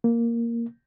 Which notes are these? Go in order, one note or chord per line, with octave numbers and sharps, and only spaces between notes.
A#3